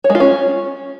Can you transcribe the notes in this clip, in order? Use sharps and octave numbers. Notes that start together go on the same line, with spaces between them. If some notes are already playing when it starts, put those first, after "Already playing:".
C#5
G#3
F4
C#4